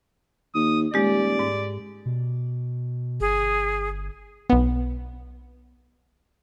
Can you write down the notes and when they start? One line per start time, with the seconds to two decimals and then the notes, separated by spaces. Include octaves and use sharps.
0.55 D#2 D#6
0.94 D#1 G#3 G4 D5
1.39 G#2
2.06 B2
3.20 G1 G#4
4.50 B1 B3